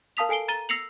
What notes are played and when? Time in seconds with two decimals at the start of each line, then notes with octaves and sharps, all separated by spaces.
0.17 A#4 F5 A5 D#6 B6 F7
0.29 A4 G#5 C7 D7 G7
0.48 A#5 A6 D#7 G7
0.69 E6 A#6 C7 C#7 F7 F#7